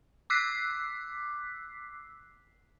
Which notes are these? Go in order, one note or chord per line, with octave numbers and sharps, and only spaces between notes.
D6 E6 F#6 B6 C7